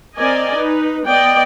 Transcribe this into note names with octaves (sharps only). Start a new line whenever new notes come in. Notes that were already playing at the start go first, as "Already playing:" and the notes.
C4 A#4 D5 D#5 G#5
D#4 B4
B3 D5 D#5 G5